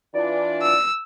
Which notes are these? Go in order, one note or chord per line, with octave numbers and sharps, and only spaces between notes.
E3 D4 F4 D5
E6